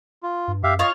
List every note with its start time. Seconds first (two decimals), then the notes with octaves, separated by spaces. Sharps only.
0.23 F4
0.48 G2
0.63 F#2 G4 E5 F5
0.79 F4 C#5 D#5